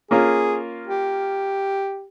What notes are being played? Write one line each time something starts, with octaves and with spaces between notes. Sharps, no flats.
A#3 C#4 F4 G#4
G4